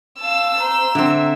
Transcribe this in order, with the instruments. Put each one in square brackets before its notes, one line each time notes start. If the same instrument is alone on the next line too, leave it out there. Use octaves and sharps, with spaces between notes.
[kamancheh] F5 A5 [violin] E6
[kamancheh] C5 [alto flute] A#5
[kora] D3 C4 [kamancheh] E5